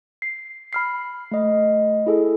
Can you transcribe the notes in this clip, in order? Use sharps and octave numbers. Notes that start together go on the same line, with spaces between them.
C7
B5 F6 C7
A3 D#5
E4 G#4 A4